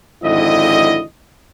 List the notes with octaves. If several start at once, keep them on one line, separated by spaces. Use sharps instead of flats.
G#1 F2 D3 E4 D#5